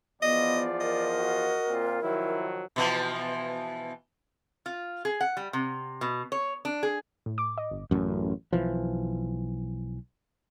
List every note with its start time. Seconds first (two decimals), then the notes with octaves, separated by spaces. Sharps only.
0.22 E2 F3 B3 F4 D5 D#5
0.81 A#4 D#5
1.19 F#4
1.68 A#2 C4 F4
2.02 D#3 F3 F#3 E4
2.76 B2 E3 F3
4.66 F4
5.05 G#4
5.21 F#5
5.37 G3
5.53 C3
6.01 B2
6.32 C#5
6.65 D4
6.83 G#4
7.26 A2
7.38 D6
7.58 D#5
7.71 G1
7.91 A1 F#2
8.53 B1 E3 F3